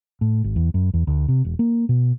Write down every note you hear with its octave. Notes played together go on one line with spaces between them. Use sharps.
A2
G#1
E2
F#2
E2
D2
C3
E1
A#3
B2